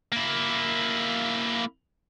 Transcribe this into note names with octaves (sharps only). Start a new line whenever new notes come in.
A#3 E4